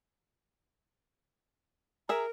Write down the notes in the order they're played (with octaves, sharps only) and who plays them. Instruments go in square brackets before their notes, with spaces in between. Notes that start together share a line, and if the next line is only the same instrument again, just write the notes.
[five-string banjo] G#4 E5 [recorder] A#4 [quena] A#5